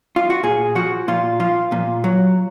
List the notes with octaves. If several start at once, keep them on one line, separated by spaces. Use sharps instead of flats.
F4
F#4
A#2 G#4
F3 F#4
A#2 F4
F3 F4
A#2
F#3